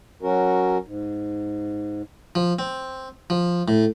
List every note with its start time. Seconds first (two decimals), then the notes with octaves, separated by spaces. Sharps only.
0.22 F#3 C#4 F#4 A#4
0.86 G#2
2.35 F3
2.59 C4
3.30 F3
3.68 A2